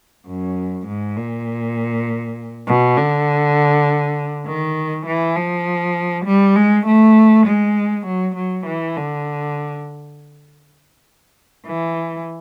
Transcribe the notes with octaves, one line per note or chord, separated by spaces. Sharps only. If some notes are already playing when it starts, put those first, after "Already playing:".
F#2
G#2
A#2
B2
D3
D#3
E3
F3
G3
G#3
A3
G#3
F#3
F#3
E3
D3
E3